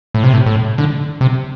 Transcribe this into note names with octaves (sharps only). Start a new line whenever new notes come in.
A2
C3
A2
A2
D3
C3